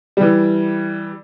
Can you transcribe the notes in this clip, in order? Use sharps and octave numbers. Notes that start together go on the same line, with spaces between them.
E3 G3